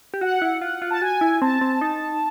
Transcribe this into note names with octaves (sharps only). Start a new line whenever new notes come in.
G4
F#4 F#5
E4
F4 F#5
F4
A5
F#4 G#5
E4
C4 A5
C4
D#4